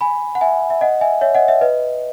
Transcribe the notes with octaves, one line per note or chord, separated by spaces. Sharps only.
G#5 B5
F#5
E5 G#5
E5
D#5 F#5
E5 G#5
C#5 E5
D#5 F#5
C#5 E5
B4 D#5